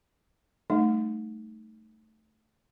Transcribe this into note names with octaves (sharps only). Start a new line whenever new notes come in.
G3 A3 D#4